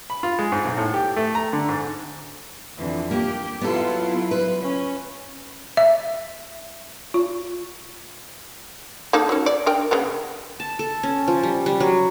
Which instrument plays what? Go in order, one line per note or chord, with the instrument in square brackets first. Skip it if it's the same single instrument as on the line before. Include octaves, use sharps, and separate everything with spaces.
[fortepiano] B5
F4
G#3
G#2
B1
A2
G4
A3
A#5
D3
G#2
[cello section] F2 D3 E3
[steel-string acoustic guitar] A#3 [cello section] G4
[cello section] F#3 E4 F4 [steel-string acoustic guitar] B3 A4
[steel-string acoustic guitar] B4
[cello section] C#4
[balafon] E5
F4
[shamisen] A#3 D#4 A4
F#3 C#4
D5
D4 A#4 G5
C#3 A#3 B3
[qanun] A5
A4
C#4
F3
G3
G3
F#3